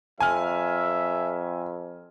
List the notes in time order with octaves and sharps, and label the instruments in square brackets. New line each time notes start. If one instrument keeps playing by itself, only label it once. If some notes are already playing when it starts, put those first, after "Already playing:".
[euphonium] F2 [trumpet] E5 [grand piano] G#5 F6